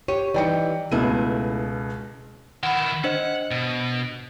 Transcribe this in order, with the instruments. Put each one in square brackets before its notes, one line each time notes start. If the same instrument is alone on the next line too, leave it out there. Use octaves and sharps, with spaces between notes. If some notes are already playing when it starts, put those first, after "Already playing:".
[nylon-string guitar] G4 C#5 [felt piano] D#7
[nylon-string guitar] E3 G3 D#4 [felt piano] D5 G5 C#7
[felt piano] C#2 B2 D#7 [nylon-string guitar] A3 E4
[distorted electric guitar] D#3 E4 [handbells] F#5 B5
[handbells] D4 C5 D#5 [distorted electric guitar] F#5
[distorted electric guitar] B2